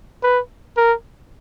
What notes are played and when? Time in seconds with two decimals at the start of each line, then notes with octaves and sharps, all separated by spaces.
0.23 B4
0.77 A#4